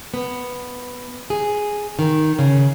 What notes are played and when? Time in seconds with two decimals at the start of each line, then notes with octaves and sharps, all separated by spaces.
0.14 B3
1.30 G#4
1.99 D#3
2.39 C#3